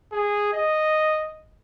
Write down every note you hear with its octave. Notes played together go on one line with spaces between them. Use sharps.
G#4
D#5